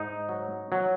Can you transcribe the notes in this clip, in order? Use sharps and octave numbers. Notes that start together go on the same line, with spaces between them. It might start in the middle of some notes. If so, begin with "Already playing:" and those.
Already playing: G#2 D#4
F#3
F#3